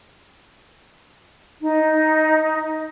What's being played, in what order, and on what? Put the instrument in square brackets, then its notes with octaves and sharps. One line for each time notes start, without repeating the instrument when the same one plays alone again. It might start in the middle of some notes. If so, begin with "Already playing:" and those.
[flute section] D#4